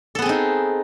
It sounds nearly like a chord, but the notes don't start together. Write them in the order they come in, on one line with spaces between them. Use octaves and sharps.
A4 B3 G#4 C4 D#4